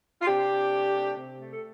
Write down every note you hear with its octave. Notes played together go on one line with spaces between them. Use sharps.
F4
C3 D4 G4
C3
A3
C3
C3
A3
A4